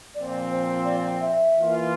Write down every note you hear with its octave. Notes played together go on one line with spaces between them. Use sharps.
A#2 F3 C4 D5
C5
D5
E5
E3 A#3 F4